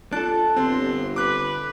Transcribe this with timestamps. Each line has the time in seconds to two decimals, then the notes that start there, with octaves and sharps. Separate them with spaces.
0.13 D4 F4 A4 A5 F#6
0.56 G1 C4 C6
1.16 B4 D6 F#6